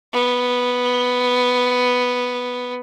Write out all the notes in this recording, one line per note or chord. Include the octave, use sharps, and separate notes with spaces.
B3